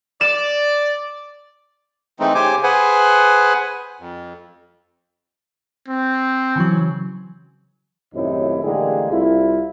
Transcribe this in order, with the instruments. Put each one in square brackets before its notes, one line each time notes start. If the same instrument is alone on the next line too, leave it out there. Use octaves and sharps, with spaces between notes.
[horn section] D5 [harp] E7
[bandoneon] E3 G#3 A3 C4 D#4
C#3 G4 C5 G#5 D6
G#4 B4 C5 F#5 G#5
F2
[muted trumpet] C4
[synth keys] C#3 E3 F#3
[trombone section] G#1 F#2 A2 C3 D#4 E4
A1 D3 G#3 A#3 G4 G#4
C2 E4 F4